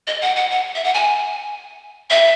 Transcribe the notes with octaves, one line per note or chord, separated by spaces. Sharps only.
D#5
F#5
F#5
F#5
E5
F#5
G#5
E5